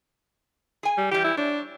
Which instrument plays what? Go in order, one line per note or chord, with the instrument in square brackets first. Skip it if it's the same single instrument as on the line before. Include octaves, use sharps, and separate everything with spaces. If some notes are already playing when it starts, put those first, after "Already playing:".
[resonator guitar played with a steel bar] G#4 G#5
[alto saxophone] G3
[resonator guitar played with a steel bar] E3 G3 [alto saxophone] G4
[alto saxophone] E4
[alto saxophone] D4 [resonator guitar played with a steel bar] C#5